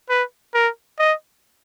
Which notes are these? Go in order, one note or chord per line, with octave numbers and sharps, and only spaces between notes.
B4
A#4
D#5